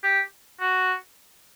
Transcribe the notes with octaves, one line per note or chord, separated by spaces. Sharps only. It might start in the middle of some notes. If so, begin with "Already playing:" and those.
G4
F#4